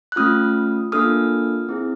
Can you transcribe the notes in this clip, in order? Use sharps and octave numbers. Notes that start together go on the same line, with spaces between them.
F#6
A3 C#4 F4 D#6 F6
A#3 D4 F4 A4 D#6 F6
C4 E4 G#4